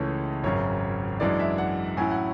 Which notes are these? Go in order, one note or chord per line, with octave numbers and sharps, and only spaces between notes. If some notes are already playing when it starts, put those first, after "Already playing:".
Already playing: C#2 C#3 E3 A3 C#5
G#1 F#2 C#3 C#5
F#2 E3 G#3 D4 D5
E5
F#5
A2 F#3 C#4 E4 G#5
F#5